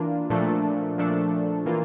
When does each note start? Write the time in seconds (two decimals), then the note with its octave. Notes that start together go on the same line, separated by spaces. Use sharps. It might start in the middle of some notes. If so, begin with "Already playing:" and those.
Already playing: E3 A#3 D4 F4
0.30 A#2 F3 A3 D4 A4
0.98 A#2 F3 A3 D4 A4
1.66 E3 A#3 F4